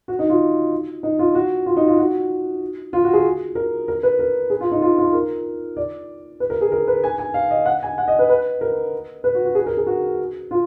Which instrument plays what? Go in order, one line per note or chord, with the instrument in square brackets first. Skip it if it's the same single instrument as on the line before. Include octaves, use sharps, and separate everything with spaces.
[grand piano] F#4
D#4
F4
D#4
F4
F#4
F4
D#4
F4
F#4
F4
F#4
G#4
A#4
A#4
B4
A#4
G#4
F4
D#4
F4
F4
A#4
D5
B4
A#4
G#4
A#4
B4
G#5
G#5
F5
D#5
F#5
G#5
F#5
D#5
B4
B4
A#4
B4
F#4
F#4
G#4
A#4
G#4
F#4
F4